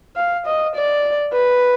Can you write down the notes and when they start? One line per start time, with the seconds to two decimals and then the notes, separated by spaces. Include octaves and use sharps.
0.16 F5
0.46 D#5
0.75 D5
1.33 B4